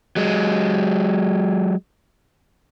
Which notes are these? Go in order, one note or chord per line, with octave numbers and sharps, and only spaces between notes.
F#3 G#3